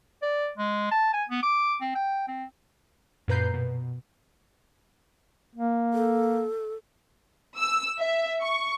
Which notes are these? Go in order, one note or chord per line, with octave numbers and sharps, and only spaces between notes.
D5
G#3
A5
G#5
B3
D6
C4
G5
C4
F#2 A#2 B4 A#5 G6 C7
B2
A#3
A4
E6
E5
C#6